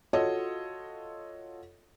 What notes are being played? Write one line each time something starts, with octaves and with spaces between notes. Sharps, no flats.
F4 F#4 A4 C#5 D#5